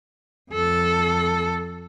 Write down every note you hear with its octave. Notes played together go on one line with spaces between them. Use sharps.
F2 A4